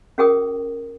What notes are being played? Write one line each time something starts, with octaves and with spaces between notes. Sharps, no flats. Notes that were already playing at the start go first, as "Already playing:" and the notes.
C#4 F#4 G#4 A#4 G5 D#6